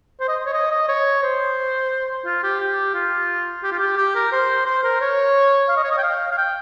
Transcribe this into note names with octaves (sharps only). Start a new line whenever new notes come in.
C5
D#5
C#5
D#5
D#5
C#5
C5
F4
G4
G4
F4
G4
F4
G4
G4
A#4
C5
C5
A#4
C#5
F5
D#5
C#5
D#5
G5
F5
F5
G5